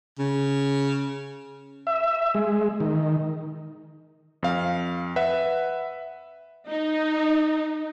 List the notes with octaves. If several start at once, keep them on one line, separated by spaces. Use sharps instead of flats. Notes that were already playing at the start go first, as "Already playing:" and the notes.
C#3
E5
G#3
D#3
F2 F5
B4 E5 F#5
D#4